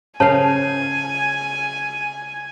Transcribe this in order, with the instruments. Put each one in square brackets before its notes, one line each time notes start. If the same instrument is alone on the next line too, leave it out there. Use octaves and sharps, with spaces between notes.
[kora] C#3 A#4 F5 [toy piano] C#5 A5 [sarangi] G#5